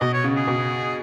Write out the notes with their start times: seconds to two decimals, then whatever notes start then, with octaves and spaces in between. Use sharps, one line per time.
0.01 B2 D#5
0.13 C#5
0.24 C#3
0.37 G#4
0.47 B2